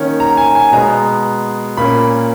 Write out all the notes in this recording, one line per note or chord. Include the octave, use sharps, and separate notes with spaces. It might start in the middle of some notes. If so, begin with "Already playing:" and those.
Already playing: D#3 A#3 C#4
A#5
G#5
G#5
B2 G#3 B3 A#5
A#2 A#3 C#4 B5